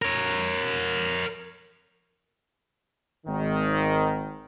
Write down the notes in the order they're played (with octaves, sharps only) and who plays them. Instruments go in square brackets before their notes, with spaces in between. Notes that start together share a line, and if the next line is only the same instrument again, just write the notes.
[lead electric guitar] A#4 C#5
[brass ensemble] G#1 D#3